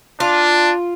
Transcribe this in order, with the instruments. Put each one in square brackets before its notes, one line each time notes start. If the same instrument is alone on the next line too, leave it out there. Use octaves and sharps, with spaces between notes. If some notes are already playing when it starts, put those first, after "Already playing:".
[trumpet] D4 [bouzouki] F4